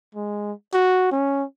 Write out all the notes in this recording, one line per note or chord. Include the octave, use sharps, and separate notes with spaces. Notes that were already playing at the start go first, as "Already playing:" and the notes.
G#3
F#4
C#4